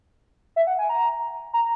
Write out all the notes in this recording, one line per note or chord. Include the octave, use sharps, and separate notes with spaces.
E5
F#5
G#5
A#5
A#5